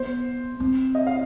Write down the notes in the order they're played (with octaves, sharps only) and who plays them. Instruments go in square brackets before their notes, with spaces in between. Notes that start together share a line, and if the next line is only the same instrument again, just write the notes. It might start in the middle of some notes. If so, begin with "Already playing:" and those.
Already playing: [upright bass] B3 [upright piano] C5
[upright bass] C4
[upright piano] D#5
F5